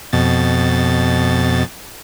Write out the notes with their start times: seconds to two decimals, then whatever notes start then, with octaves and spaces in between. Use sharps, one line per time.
0.13 F2 B2 A6